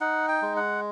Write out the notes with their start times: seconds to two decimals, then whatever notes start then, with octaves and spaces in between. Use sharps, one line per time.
0.01 D#4 F#5
0.28 G5
0.42 G#3
0.56 F#5